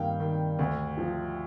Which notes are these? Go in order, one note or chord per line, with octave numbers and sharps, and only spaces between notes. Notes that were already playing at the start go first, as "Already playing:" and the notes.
Already playing: G2 D#3 A#3 F5 G5
D#3
D2
F3